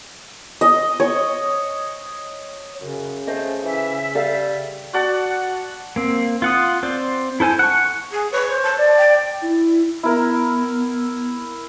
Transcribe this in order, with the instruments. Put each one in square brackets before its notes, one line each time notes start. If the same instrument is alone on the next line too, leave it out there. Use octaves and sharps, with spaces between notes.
[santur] D#5
C#5
[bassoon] F#2 [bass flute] C#3
[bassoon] A3 [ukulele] C5 D#5
[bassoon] E3 [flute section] E5
[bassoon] G3 [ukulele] A4 F5
[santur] F#4 D5 F#5 A5
[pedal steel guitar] A#3 C4
F4 F#5 D#6
C4 C5 D5
E4 A4 C5 G#5
F#5 C#6
[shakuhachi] G#4
[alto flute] B4 [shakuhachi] C#5
[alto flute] C5
[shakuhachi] A5
[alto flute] D5
[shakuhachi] G5
[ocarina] E4
[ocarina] B3 [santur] E4 A#4